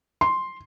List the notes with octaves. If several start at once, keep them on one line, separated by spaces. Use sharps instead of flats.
C6